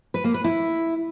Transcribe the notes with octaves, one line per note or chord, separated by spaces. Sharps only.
B4
A#3
B4
E4